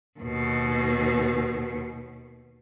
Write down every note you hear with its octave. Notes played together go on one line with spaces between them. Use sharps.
D#2 B2